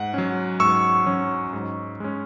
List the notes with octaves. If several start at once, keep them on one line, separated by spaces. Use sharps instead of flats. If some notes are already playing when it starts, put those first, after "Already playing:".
Already playing: G#2 F#5
F#3 C#4
G#2 C#6 E6
F#3 C#4
G#2
G#3 C#4